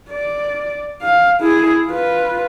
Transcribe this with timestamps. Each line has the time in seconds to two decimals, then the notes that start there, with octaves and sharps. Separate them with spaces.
0.11 D5
1.02 F5
1.41 E4 G#4
1.87 F4 B4